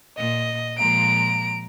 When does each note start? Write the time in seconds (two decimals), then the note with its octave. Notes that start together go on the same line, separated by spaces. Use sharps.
0.18 A#2 D#5
0.78 A#2 F3 G#3 A#5 D7